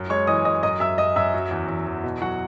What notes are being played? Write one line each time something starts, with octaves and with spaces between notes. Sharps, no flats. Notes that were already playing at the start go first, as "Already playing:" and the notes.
Already playing: F#2
G#3 C#5 C#6
E3 D#5 D#6
G#3 D#5 D#6
F#2 D#5 D#6
F#2 E5 E6
F#2 D#5 D#6
F#2 E5 E6
F#3
E2
E2
E2
B2
F#3 F#4 F#5